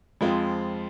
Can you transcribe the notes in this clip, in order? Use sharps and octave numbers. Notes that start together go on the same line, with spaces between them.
F2 F3 G#3 C4 F4